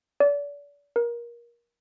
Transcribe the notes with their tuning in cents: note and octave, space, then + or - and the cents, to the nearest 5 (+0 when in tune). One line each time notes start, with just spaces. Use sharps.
D5 -35
A#4 +25